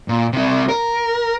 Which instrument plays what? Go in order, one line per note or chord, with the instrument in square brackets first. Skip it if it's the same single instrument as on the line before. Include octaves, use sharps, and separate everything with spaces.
[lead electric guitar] A#2
C3 E4
A#4